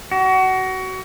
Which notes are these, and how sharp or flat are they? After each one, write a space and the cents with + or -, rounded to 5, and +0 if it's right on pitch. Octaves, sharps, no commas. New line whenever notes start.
F#4 +25